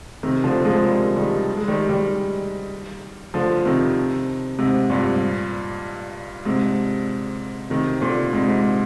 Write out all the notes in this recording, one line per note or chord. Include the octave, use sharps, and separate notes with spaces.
C3 D#3
D3 F3
F3 G#3
G3 A#3
D#3 G3
G#3
D#3 G3
D#3 G3
D3 F3
C3 D#3
G#2 C3
G2 A#2
G#2 C3
C3 D#3
A#2 D3
G#2 C3
G#2